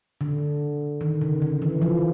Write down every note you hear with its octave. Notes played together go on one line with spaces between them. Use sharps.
D3
D#3
C#3
D3
E3
F3